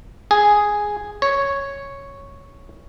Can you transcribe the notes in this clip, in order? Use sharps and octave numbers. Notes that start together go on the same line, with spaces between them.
G#4
C#5